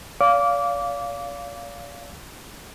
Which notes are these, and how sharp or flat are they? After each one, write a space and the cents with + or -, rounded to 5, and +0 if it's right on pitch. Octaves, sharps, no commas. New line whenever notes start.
D5 -45 F5 +0 D6 -20